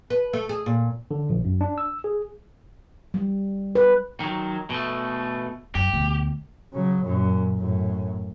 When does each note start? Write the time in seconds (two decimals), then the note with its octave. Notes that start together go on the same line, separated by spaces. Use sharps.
0.10 B4
0.33 A3
0.49 G#4
0.66 A#2
1.11 D3
1.30 A#1
1.45 F#2
1.61 D4
1.78 E6
2.04 G#4
3.14 G3
3.75 B4
4.20 D#3 F#3
4.70 B2 A3
5.75 F#2 G4
5.93 D2 B2
6.73 C#3 F#3
7.03 F#2 A#2
7.58 F#2 A2